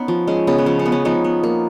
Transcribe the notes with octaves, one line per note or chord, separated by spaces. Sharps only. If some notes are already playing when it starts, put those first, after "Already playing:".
Already playing: B3 C#4 D#4
F3
G#3 C#4
C#3 B3
B3
F3 C#4
C#4
B3
C#4
F3 B3 D#4
B3
A#3